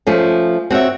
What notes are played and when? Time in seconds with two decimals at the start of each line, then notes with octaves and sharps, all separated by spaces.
0.07 F3 A3 C#4
0.70 C4 F#4 C#5 E5